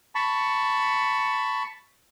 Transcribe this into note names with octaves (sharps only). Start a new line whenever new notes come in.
A5 B5 C#6